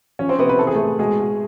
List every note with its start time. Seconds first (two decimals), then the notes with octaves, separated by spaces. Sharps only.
0.19 F3 C#4 C#5
0.29 C4 C5
0.39 C3 B3 B4
0.49 B3 B4
0.59 E3 A4
0.67 G#4
0.74 A2 A3 A4
0.99 B2 G#3 G#4
1.19 B2